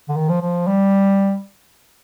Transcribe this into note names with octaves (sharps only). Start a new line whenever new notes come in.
D3
D#3
F3
F3
G3